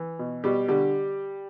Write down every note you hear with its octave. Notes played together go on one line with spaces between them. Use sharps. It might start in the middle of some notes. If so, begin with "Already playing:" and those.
Already playing: E3
B2
B2 G3 G4
D3 G3 G4